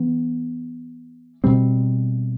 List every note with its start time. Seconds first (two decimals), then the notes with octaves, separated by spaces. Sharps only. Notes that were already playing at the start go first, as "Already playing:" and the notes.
Already playing: E3 B3 D4
1.44 B2 G3 C4